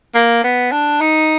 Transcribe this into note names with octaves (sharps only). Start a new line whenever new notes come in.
A#3
B3
D4
D#4